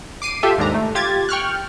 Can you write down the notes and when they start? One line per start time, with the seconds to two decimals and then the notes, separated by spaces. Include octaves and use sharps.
0.22 D6 C7 D#7
0.43 F4 G4 A4 E5
0.57 D#2 G#2 D4 A#5
0.74 A3
0.95 F4 G4 G#6 A6
1.29 G5 C#6 F6 F#6